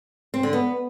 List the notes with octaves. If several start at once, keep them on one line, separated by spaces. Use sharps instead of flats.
C4
D3
B3